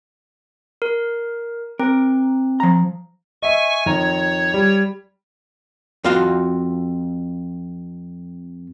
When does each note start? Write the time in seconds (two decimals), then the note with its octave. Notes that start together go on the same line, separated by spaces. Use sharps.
0.82 A#4
1.79 C4 A#4
2.60 F3 A#5
3.42 D#5 E5 G#5 C#6
3.86 F2 D#3 C#5 A#5
4.54 G3
6.04 F2 F4 F#4 F5 C6